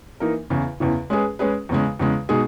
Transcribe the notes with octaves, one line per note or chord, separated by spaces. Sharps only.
E3 A#3 D#4 A#4
E2 C#3 E3
E2 C#3 E3
G#3 C#4 G#4 B4
G#3 C#4 G#4 B4
E2 C#3 G#3
E2 C#3 G#3
B2 G#3 D#4 G#4